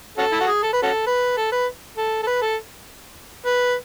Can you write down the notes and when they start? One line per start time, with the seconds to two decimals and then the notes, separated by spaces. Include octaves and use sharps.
0.18 C#4 F#4 A4
0.32 E4
0.40 F#4
0.47 G#4
0.63 A4
0.73 B4
0.83 C#4 F#4 A4
1.07 B4
1.37 A4
1.52 B4
1.98 A4
2.23 A4
2.27 B4
2.42 A4
3.46 B4